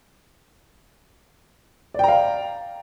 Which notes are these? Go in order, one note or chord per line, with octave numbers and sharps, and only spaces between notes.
D5 F5 G5 A#5